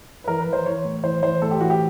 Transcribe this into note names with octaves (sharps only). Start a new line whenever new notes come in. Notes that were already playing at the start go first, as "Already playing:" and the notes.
B4
E3 A#4
B4
E3
C5
E3 C#5
A2
E3 C5
E3 C5
A2 A4
G4
E3 F#4
G4